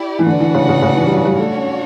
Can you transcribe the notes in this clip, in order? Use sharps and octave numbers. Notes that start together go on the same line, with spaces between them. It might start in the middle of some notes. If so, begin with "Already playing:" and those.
Already playing: E4 G4 D5
E3
D3 D4 F#4 B4 F#5
E3
C#3
C#3
C#3
E3
G3
F#3
G3
A3 D4 F#4 C#5
C#4